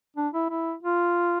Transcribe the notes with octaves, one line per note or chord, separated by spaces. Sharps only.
D4
E4
E4
F4